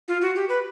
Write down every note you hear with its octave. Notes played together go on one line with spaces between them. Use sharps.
F4
F#4
G4
B4